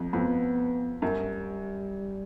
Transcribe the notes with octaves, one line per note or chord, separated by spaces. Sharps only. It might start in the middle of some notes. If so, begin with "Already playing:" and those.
Already playing: F2
F2 B3
F#2 G3